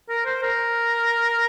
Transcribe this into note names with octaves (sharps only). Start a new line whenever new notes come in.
A#4
C5
A#4